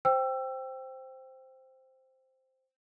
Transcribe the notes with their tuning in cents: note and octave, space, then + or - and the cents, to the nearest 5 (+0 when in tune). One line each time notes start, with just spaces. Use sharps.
C5 +0 G5 +0 E6 +20